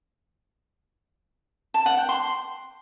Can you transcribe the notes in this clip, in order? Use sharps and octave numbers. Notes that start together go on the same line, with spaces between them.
A5
F#5
G5
C6